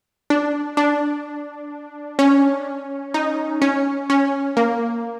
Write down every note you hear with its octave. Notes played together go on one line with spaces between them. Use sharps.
D4
D4
C#4
D#4
C#4
C#4
A#3